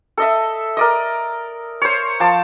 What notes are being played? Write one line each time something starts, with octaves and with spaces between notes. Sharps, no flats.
A4 D#5 E5
A#4 D5 D#5
C5 C#5
F3 A5 D6